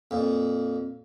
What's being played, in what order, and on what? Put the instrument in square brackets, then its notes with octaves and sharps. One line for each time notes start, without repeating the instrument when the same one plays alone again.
[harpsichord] F2 A#2